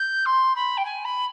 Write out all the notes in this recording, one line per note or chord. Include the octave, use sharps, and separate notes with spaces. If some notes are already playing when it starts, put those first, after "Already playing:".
Already playing: G6
C6
B5
G5
G#5
B5